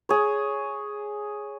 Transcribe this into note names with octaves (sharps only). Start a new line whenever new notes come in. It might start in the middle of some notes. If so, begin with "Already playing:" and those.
G#4 C#5